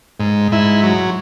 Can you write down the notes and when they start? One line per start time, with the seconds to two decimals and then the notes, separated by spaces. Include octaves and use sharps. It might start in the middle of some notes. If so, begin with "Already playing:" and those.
0.20 G#2
0.52 G#2 E4
0.83 F#3